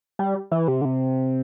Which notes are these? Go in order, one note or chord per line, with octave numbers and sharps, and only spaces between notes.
G3
E3
C3
D3
C3